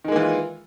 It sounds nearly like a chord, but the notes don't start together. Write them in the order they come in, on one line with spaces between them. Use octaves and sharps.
D#3 G#3 A#3 E3 F4